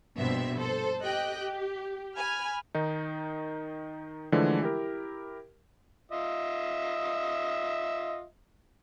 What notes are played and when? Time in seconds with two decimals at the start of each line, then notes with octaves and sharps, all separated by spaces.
0.18 A#1 G2 B2 C4 E5
0.57 A4 C5
1.03 G4 D#5 G5 F#6
1.39 G4
2.16 G#5 B5 F6
2.75 D#3 D#4
4.32 D3 E3 F3 G#3 A3
4.62 E4 G4 A#4
6.12 F4 D#5 E5